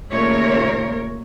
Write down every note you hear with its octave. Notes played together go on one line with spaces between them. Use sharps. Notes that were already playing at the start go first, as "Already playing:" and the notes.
D#2 A#2 C#3 A3 A#4 C#5